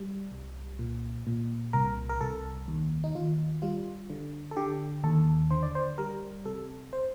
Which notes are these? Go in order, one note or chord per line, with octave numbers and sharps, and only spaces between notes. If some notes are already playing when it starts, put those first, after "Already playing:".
Already playing: G3
C2
A#2
A#2
C2 A#4
A#4
C2 A4
D#2
D#4
D#2 F4
G3 F4
D3
A4
D3 G4
D#2 A4
D3 C5
D5
C5
G3 A#4
C3 A4
C5